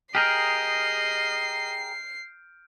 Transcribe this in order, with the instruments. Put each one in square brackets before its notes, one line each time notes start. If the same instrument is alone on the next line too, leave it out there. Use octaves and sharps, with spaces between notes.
[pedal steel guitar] G4 G#4 A#4 [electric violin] D#5 [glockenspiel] F6 G6 D7 [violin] C7